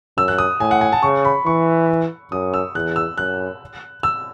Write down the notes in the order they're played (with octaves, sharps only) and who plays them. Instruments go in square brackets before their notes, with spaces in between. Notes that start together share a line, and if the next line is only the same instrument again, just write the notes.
[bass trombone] F#2 [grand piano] E6
[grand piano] F#6
D#6
[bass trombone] A2 [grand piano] G#5
[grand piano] F#5
G#5
A5
[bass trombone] C#3 [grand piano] C#6
[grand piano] B5
[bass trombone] E3 [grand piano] C#6
[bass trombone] F#2 [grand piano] D#6
[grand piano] E6
[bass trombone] E2 [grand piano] F#6
[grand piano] E6
[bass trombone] F#2 [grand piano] F#6
[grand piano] E6